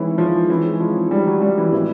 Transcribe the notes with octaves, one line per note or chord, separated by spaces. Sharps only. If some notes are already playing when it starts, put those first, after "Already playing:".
Already playing: E3 G#3 C4 D#4 G#4 C#5
F3
E3
F3
G3
F#3
G3
E3
A2 E3 F3 G#3 C4 F4